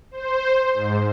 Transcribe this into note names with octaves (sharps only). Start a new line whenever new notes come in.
C5
G#2